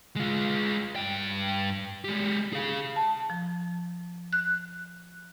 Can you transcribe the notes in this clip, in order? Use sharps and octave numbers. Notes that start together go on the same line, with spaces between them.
G#3 F4
G2 G5
G#3 G4
G#4 F5
A5
F3
F#6